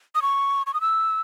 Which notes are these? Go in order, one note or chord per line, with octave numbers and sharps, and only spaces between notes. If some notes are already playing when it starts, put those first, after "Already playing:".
D#6
C#6
C#6
D#6
E6